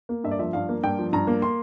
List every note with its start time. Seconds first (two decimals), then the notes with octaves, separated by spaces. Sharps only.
0.09 A#3
0.24 G2 E5
0.31 D5
0.39 F3 E5
0.53 G2 F5
0.69 A#3
0.83 G2 G5
0.99 F3
1.13 G2 A#5
1.27 A#3
1.42 C6